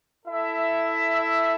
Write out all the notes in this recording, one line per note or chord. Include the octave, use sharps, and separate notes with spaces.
E4 A4 E5